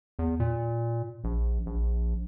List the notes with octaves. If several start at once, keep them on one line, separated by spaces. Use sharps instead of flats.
E2
A#2
A#1
A#1